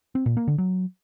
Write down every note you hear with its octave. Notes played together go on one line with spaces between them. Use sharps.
C4
A#2
A#3
D3
F#3